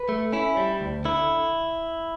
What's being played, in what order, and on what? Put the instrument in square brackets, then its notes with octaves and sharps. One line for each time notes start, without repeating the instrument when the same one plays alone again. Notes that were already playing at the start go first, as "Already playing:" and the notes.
Already playing: [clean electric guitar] B4
A3
C#4 E4
G3
D2
D3 E4